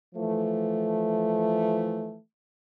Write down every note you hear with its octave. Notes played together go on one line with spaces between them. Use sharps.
E3 F3 A3